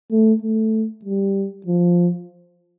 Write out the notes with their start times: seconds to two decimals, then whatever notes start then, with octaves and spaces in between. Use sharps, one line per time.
0.12 A3
0.42 A3
1.05 G3
1.67 F3